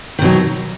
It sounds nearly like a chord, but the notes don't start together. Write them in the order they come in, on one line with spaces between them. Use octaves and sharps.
D#3 B2 F#3